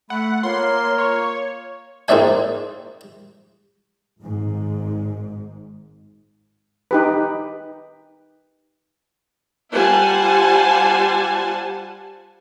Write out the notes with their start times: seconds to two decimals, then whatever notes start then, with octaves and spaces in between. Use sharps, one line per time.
0.10 A3 F#5 B5
0.43 A#3 F4 C#5 C6
0.98 C#5 C#6
2.08 G#2 A#3 C4 D5 E5 G#5
4.21 G#1 G#2
6.91 D#4 G4 B4
9.72 G3 F4 C5 F#5 G#5 A5